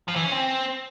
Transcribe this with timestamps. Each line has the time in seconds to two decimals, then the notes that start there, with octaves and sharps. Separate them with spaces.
0.08 F3
0.16 E3
0.24 C#4
0.32 C4